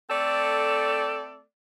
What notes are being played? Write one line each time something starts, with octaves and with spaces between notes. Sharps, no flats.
A3 C4 A4 D5